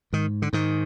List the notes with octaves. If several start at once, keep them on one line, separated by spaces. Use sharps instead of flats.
G#2 D#3
D3
G#2 D#3